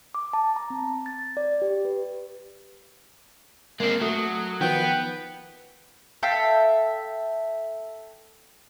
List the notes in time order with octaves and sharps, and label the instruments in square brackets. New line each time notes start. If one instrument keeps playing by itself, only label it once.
[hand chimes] D6
A5
A#5
C4
A6
D5
G4
B4
[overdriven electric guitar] G#3 C4 [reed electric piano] A#3 [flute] A#4
[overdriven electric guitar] F#3 [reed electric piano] A3 [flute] D#6
[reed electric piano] D#3 F3 [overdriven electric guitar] B3 [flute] B4 [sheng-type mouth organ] G5
[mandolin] A4 E5 F5 G5